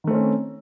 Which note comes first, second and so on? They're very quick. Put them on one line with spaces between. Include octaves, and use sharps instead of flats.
D#3 A3 C4 C#4